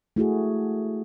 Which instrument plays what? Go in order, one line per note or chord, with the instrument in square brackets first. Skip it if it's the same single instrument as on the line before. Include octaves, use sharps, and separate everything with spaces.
[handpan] A3 E4 F#4 G#4